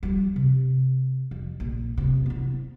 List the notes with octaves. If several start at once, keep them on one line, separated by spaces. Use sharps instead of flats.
F3 G3
C3
F2
A#1
E2 C3
B3 E4